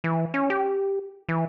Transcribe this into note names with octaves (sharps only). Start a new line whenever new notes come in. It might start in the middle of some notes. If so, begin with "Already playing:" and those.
E3
C#4
G4
E3